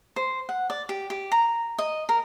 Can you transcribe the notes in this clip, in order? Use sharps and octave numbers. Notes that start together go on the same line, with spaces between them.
C5
F#5
D5
G4
G4
A#5
D#5
A#4